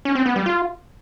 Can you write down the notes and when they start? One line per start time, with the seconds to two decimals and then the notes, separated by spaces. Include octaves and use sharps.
0.05 C#4
0.15 C4
0.26 B3
0.36 G3
0.46 F4